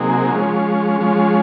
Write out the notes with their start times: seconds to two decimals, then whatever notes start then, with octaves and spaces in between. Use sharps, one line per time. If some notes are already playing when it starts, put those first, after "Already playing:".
Already playing: C3 F#3 A#3 D#4 G#4
0.31 F3 G#3 C#4
1.01 F3 G#3 C#4